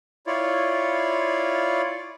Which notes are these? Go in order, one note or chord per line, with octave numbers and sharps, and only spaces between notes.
E4 F4 C#5 D5